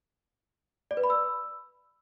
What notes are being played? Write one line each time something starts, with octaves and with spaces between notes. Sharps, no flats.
D5
B4
B5
E6